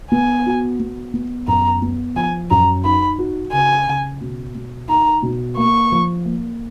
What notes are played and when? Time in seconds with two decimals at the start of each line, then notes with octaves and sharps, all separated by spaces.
0.12 B3 G#5
0.46 F#4
0.80 B3
1.14 B3
1.48 F#2 A#5
1.82 B3
2.16 F3 G#5
2.50 F#2 A#5
2.85 D#4 B5
3.18 F#4
3.52 C#3 G#5
3.87 C#3
4.21 B2
4.55 B2
4.88 D#4 A#5
5.23 B2
5.57 A#3 C#6
5.92 F3
6.25 A#3